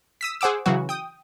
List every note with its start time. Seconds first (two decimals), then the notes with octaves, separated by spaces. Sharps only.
0.21 D#6 E6 B6
0.41 G#4 C5 F#5 D6 E6
0.66 C#3 E3 F#3 F#4
0.89 G5 D#6